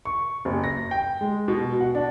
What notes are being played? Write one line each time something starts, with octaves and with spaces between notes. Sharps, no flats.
C#6
F#1
A#6
G5
G#3
B2
F#5
D4